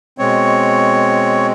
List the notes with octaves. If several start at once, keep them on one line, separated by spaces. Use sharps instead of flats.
B2 G#3 C4 C#5